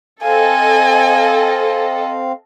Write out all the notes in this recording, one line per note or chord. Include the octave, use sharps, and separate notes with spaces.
C4 A4 D#5 F5 G#5